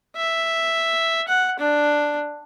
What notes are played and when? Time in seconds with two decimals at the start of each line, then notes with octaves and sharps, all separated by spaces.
0.16 E5
1.28 F#5
1.59 D4